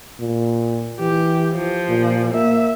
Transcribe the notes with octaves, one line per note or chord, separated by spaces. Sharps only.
A#2
E3 G4
F3
A#2
A#3 E5